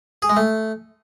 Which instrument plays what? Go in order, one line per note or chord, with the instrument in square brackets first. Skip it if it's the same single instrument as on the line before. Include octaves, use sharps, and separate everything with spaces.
[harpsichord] G#4
G#3
A3